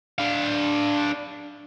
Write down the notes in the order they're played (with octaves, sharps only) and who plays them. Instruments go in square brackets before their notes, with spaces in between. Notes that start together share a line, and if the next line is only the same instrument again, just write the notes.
[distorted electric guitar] D4 F5